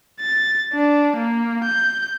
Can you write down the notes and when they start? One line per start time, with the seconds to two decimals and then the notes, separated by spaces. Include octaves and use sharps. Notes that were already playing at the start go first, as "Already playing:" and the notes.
0.20 A6
0.73 D4
1.16 A#3
1.64 G6